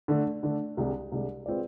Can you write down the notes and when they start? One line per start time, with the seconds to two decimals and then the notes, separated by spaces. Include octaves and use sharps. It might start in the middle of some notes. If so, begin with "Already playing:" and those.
0.08 D3 A3 D4
0.43 D3 A3 D4
0.77 C2 C3 G#3 D4
1.12 C2 C3 G#3 D4
1.46 G#3 C4 F4 B4 D5